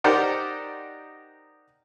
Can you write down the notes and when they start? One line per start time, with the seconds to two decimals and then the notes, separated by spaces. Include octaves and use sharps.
0.04 D#4 G4 A#4 C5 D5 F#5